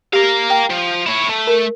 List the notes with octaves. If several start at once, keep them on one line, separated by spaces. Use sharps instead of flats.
G4 A#4 F5
G5
F3
E4 C#5
A3
A#4